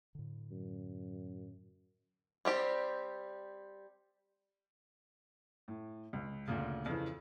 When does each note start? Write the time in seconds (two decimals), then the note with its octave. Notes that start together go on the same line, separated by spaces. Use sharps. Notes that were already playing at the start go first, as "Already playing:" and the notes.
0.15 A2 D3
0.51 F#2
2.45 G3 C4 G4
5.68 A2
6.13 C#2
6.48 D2 A#2 C#3
6.86 F2 C#3 E3